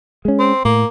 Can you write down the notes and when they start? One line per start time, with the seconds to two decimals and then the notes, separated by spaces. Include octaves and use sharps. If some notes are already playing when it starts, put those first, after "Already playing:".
0.25 G#3 C#4
0.39 C4
0.65 A2 A#3